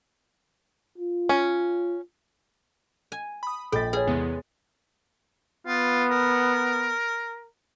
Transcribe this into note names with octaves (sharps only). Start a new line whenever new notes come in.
F4
C#4
G#5
B5 D#6
A#1 A4 D#5 G5 B5 A6 B6
G#4 B4 C#5
E2 C3 G#3 B3
B3 F4
A#4